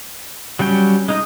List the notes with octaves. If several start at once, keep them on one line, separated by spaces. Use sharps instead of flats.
F#3 G3 C#4 G5
G#3 D#4 D#5